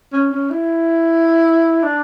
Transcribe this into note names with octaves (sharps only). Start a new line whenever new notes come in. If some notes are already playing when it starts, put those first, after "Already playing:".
C#4
C#4
E4
D4